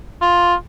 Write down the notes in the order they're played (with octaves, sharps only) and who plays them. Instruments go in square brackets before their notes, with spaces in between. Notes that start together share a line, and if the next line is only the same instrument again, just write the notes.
[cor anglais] F4